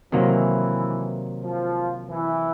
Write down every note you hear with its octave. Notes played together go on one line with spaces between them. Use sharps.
C3 D#3 E3 F#3 A#3
F3
E3